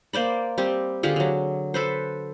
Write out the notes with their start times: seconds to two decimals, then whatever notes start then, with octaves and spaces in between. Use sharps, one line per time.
0.13 A#3 C5 D5 B5
0.58 G3 C4 G4
1.03 D3 F4 G4 G#4
1.16 D3 F#3
1.74 A4 B4 C5